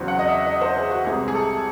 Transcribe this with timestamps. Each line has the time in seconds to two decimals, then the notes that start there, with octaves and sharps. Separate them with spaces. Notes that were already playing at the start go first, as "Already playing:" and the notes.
Already playing: E2 C#3 F#3 C4
0.08 F#5
0.19 D#5
0.28 E5
0.46 D#5
0.61 C5
0.76 G#4
0.91 F#4
1.05 C2 C3 E3 G#3 C4 G#4
1.28 G#4
1.34 A4